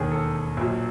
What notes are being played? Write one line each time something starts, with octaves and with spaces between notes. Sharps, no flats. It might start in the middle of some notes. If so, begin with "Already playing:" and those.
Already playing: E1 D#2 D#3 G#4
A4
A#1 A#2 F#3